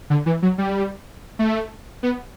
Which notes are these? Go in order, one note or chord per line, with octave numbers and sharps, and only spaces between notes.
D3
E3
F#3
G3
A3
B3